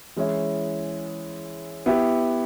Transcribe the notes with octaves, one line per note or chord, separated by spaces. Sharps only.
E3 G#3 C#4 E4
B3 E4 G4